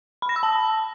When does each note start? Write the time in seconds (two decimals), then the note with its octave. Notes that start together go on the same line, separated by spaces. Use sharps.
0.22 B5
0.29 A#6
0.36 E6
0.43 A5